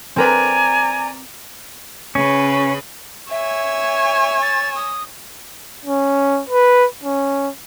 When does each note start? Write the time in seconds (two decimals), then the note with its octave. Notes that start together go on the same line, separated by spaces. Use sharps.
0.16 C4 A#4 B4 D5 G#5 A#5
2.15 C#3 C#4 B4
3.31 C#5 E5 G#5 E6
4.42 A6
4.76 D#6
5.85 C#4
6.49 B4
7.04 C#4